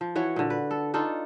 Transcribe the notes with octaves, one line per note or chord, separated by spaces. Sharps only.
F3
E3 F#4 C#5
A#2 D3
B4
A4
D4 D#4 F4 A4